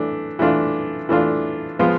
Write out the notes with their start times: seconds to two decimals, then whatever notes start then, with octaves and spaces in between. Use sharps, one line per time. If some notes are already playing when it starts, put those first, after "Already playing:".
Already playing: E3 A3 D4
0.39 E3 A3 D4 F4
1.09 E3 A3 D4 F4
1.79 F3 G#3 B3 F4